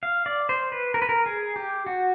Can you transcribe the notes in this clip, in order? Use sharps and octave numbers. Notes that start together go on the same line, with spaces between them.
F5
D5
C5
B4
A#4
B4
A#4
G#4
G4
F#4